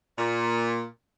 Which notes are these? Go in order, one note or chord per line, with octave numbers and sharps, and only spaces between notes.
A#2